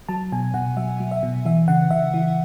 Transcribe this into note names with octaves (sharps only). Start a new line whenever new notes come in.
F#3 A5
B2 G#5
B2 F#5
F#3 E5
F#3
E5
B2
E3 E5
C#3 F#5
C#3 E5
E3